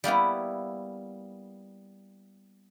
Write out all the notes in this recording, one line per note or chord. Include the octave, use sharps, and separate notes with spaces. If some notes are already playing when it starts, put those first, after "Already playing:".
G3 A#3 B3 E4